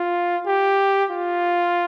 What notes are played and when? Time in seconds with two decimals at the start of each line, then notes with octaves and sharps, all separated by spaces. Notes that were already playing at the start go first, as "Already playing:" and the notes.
Already playing: F4
0.47 G4
1.11 F4